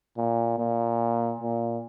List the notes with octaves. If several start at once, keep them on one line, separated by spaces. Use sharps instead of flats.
A#2
A#2
A#2